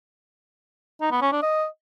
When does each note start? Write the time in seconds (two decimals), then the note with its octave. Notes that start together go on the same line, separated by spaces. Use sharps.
1.01 D#4
1.11 B3
1.22 C#4
1.32 D4
1.42 D#5